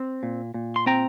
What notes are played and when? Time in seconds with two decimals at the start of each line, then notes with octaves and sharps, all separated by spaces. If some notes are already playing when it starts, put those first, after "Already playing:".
Already playing: C4
0.23 A#2
0.54 A#2
0.76 C6
0.86 C4 G5 A#5